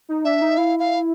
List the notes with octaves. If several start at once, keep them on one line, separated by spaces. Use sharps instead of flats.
D#4
D4 E5
D#4
E4 F5
F5